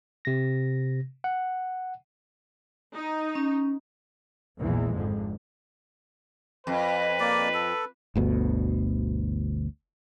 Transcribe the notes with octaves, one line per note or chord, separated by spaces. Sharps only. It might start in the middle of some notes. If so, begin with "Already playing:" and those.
C3 A#6
F#5
D#4
C#4
A#1 E2 E3 G#3
G#1 F2 D3
F2 B4
A#3 D5
A4
G1 D2 B2